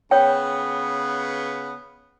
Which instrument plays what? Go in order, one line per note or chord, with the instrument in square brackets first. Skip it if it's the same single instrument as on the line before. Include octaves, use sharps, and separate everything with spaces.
[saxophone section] C#3 B3 [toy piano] C#5 G5